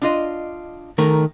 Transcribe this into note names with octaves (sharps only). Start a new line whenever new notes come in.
D4 F4 D#5
D#3 A3 A#4